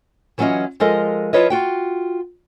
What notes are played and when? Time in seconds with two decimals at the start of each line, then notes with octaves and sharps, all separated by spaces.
0.38 E3 F#3 C#4 D4 F4 D#5
0.80 F3 G#3 A4 A#4 D#5
1.33 F3 E4 F4 B4 C#5 D#5
1.50 F4 F#4 G5